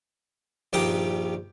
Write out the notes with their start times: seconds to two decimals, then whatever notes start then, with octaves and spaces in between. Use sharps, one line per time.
0.73 A#1 G2 D#3 G4 G5 D#6